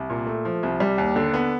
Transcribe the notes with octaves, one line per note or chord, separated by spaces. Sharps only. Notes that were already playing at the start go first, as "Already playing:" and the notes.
Already playing: C2
A#2
A3
F3
C2
G3
D#2
D3
B3